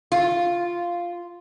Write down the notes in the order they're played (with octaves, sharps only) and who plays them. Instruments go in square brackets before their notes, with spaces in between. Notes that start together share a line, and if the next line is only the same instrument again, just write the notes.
[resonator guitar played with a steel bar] F4